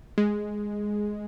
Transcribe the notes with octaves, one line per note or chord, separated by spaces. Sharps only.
G#3